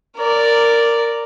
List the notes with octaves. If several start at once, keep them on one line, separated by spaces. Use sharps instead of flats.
A#4 D5